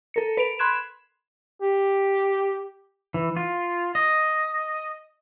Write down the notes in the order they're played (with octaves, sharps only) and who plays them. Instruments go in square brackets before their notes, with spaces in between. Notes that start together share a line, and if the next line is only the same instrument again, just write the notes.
[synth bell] A4 A#4 C#7
B4 D7 F7
B5 C6 F#6 G#6 E7
[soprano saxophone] G4
[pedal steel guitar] E3
F4
D#5